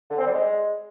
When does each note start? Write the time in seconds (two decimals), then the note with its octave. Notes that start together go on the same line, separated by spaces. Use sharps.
0.10 D3
0.18 C4
0.26 G3
0.34 G#3